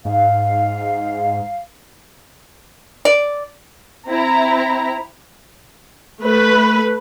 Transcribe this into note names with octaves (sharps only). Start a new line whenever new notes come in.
G#2 F5
D5
C4 E4 A#5
A3 B4